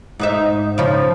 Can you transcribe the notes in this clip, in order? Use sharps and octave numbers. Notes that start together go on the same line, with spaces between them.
G#2 D#4 E5
C#3 F3